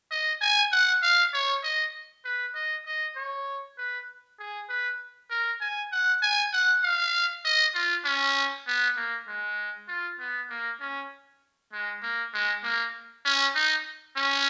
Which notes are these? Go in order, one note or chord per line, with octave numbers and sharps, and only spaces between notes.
D#5
G#5
F#5
F5
C#5
D#5
B4
D#5
D#5
C#5
B4
G#4
B4
A#4
G#5
F#5
G#5
F#5
F5
D#5
F4
C#4
B3
A#3
G#3
F4
B3
A#3
C#4
G#3
A#3
G#3
A#3
C#4
D#4
C#4